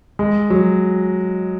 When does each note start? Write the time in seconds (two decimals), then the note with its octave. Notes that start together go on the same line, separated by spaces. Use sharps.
0.19 G#3
0.50 F#3